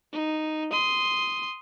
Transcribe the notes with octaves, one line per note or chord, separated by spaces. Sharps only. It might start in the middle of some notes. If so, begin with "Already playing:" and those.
D#4
C6 D#6